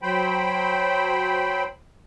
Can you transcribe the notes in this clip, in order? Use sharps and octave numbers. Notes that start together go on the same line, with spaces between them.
F#3 C5 G5 B5